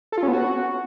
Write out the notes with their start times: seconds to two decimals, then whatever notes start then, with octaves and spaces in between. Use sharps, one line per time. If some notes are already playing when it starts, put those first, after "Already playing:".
0.12 A4
0.18 F4
0.23 C#4
0.28 B3
0.33 F#4